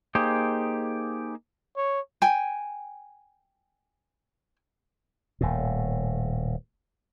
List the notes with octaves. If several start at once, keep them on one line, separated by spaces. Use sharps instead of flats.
A#3 D#4 G4 G#4 C5
C#5
G5 G#5
D#1 A2